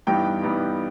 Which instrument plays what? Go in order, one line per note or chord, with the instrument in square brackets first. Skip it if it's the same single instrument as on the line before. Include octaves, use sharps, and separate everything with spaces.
[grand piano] G2 E3 G3 B3 D#4 G5
G2 E3 G3 B3 D#4